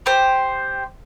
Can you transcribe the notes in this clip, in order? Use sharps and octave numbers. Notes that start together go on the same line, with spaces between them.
G4 C5